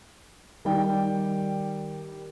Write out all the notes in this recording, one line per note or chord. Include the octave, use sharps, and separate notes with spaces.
D#3 G3 G5